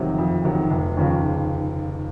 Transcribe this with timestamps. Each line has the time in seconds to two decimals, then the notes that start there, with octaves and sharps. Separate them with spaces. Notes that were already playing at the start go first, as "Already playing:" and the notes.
Already playing: F2 C3 D#3 F#3
0.18 F2
0.44 C3 D#3 F#3
0.70 F1
0.97 D#2 C#3 F3